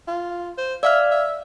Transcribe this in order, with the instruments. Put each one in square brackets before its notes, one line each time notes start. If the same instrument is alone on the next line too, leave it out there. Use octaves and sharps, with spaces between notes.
[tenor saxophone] F4
C5
[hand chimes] D5 F5 F6 [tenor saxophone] E5
[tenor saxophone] E5